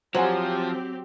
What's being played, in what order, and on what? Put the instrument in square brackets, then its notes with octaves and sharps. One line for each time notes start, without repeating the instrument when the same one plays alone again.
[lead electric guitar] F3 [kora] F#3 [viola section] C4 G4 [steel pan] C5 F#5 G#5